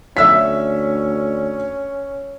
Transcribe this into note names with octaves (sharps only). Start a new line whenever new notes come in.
D2 C#4 E5 E6 B6